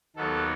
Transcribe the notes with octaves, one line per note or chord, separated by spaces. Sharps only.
D#2 D#3 F#3 B3 A4